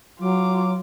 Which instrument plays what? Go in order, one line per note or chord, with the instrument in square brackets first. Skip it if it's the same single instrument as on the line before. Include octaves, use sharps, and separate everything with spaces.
[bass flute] F#3 [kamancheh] F4 D6